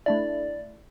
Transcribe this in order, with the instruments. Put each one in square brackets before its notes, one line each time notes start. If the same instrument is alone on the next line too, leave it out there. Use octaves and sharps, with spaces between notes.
[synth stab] A3 D4 E4 [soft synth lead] D5